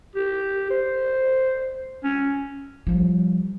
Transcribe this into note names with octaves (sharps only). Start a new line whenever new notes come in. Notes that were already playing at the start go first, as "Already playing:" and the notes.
G4
C5
C#4
F3 G3